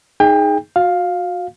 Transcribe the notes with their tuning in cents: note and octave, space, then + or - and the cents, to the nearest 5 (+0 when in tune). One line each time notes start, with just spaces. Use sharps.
D#4 +0 G#4 +0 G5 +30
F#4 -30 F5 +10